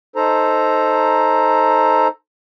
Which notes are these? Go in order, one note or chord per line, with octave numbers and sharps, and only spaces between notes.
D#4 A4 C5 A#5